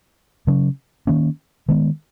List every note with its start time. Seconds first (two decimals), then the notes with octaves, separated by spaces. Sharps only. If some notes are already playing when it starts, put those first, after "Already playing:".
0.47 C#3 F#3 C#4
1.07 D#3 A#3 C#4
1.68 D#3 G#3 B3